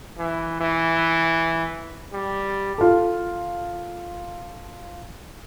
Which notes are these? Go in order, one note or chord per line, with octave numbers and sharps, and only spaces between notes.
E3
E3
G3
F4 A4